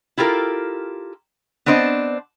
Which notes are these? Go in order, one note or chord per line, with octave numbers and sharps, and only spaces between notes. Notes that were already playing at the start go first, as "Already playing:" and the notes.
E4 F4 G4 A4 A#4
B3 C4 D4 C5 D#5